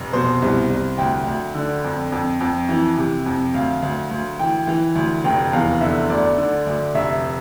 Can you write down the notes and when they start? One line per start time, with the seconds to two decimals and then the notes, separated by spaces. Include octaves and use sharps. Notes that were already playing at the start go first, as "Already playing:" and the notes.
Already playing: F1
0.13 B2 C5
0.42 C2
0.70 C2
0.98 D2 G5
1.27 D2
1.55 D3
1.84 F2
2.12 F2
2.40 F2
2.69 E3
2.98 C3
3.26 F2
3.54 D2 F5
3.82 D2
4.11 D2
4.39 E3 G5
4.67 E3
4.95 D2
5.24 F1 G5
5.53 E2 F5
5.81 D3 E5
6.10 D2 D5
6.38 D3
6.66 D2
6.95 F1 E5